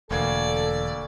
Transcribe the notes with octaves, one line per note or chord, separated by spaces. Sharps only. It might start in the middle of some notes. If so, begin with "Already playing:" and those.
E1 D2 A#3 A4 D5 G#6